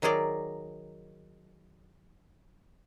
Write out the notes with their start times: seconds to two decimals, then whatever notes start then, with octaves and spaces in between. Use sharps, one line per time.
0.02 D#3 F#3 G#4 A#4 D5